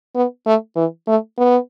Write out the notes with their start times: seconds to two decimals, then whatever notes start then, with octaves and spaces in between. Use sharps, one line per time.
0.15 B3
0.46 A3
0.76 E3
1.07 A3
1.38 B3